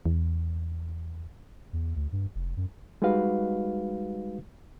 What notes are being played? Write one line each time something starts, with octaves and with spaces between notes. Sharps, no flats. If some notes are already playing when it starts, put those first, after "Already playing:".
E2
E2
D2
G2
F1
F#2
G3 G#3 D#4 F#4 B4 F5